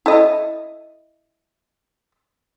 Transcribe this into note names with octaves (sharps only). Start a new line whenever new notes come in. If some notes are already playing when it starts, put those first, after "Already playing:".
E4 A4 D#5